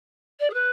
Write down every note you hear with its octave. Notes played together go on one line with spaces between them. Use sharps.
D5
G#4
B4